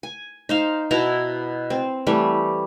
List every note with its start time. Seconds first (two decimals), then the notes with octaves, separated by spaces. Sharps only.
0.03 G#5
0.49 D#4 C5 F5
0.91 B2 E4 A5 A#5
1.70 C4
2.07 E3 G3 A3 G4